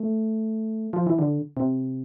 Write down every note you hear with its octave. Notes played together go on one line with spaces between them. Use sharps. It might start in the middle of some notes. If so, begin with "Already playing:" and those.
Already playing: A3
F3
E3
D3
C3